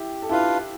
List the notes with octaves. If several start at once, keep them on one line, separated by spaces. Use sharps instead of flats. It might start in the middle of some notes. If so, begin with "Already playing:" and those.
Already playing: E4 G4
A4
D4 E4 F4 G4 B4 F5